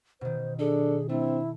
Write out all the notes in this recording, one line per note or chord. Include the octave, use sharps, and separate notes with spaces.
B2 D#3 C5
D4 G#4 A4
A3 C4 D4 E4